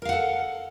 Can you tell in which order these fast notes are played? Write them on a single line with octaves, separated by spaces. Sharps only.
A#4 F5 F#5 A4